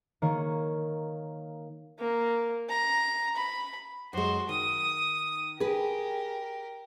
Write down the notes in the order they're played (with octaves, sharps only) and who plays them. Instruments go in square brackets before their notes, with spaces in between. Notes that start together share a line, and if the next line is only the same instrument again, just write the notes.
[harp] D#3 A#3 C#5
[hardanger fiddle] A#3
A#5
B5
[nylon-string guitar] F#2 G#3 [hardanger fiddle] F#4 C5
[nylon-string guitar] D#3 [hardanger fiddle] D#6
[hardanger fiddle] G4 A#4 [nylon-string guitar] G#4 B4